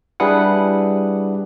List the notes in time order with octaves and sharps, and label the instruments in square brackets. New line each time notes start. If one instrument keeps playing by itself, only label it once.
[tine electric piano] G3 D4 E4 G#4 B4 F#5